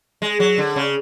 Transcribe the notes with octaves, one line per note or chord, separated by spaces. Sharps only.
G#3
F#3
D3
C#3